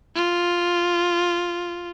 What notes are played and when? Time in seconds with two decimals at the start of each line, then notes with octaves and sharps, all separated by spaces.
0.15 F4